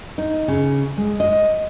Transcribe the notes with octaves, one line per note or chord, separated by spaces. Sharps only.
D#4
C#3
G#3
D#5